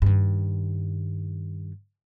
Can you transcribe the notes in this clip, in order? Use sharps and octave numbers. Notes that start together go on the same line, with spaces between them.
G2 D#3